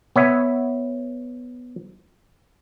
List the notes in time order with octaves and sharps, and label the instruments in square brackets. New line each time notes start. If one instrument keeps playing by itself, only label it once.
[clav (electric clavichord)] B3 C#5 E5